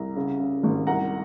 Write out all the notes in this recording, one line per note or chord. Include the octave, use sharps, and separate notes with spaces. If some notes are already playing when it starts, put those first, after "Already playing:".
Already playing: C2 A#5
C#3
C#3
G#1
C2 F#5 A#5